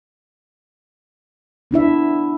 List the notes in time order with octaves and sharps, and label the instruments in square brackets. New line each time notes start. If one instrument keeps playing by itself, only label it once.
[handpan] B3 D4 E4 E5